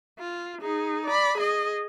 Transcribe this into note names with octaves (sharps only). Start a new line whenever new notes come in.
F4
D#4 G#4
D5 B5
G#4 D#5